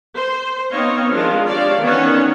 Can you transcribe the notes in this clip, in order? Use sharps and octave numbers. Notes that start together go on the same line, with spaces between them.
C5
B3 C4 D#4 C#5 D#5 F5
D#3 F3 G#3 D4 F4 F5
D4 G4 C#5 D5 F5
D#3 E3 B3 C#4 C#5 F#5